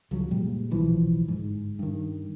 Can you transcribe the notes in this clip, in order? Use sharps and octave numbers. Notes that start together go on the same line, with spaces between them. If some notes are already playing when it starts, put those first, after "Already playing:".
C#2 F3 F#3
F#1 A#2 G3 G#3
D1 B1 E3 F3
G1 G#2
G2 D#3